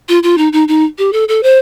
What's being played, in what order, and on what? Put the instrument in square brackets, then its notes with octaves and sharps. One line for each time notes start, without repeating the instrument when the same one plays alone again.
[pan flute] F4
F4
D#4
D#4
D#4
G4
A4
A4
C5